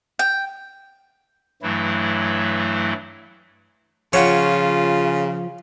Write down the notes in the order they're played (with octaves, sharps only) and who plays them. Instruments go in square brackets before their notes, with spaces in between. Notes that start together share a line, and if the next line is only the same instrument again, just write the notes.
[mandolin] G5
[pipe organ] G2 E3 F#3 A3 E4
[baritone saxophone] C#3 [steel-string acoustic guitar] F3 [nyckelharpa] F4 [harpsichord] C#5 F#5 G5